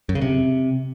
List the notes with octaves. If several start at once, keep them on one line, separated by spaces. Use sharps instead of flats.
F#2
C#3
C3